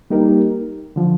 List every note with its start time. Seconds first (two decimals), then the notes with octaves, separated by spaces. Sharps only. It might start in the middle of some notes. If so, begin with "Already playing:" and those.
0.10 G3 A#3 D#4 G4 A#4
0.96 D3 F3